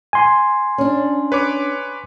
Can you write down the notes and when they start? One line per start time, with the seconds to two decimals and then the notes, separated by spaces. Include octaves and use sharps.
0.13 G#5 C6
0.78 C#4 D4
1.32 B4 C#5 D6